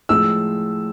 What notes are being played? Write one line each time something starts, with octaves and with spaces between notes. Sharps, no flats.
A2 F3 G#3 E6